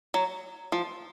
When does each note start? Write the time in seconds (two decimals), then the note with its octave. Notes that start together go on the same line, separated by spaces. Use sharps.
0.14 F#3
0.72 F3